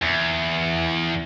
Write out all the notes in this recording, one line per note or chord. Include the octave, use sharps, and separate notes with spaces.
E2